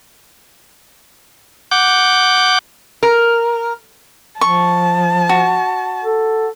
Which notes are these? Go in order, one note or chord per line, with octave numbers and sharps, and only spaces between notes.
F#5 D6 G6
A#4
F3 A5 C#6
F#4
A4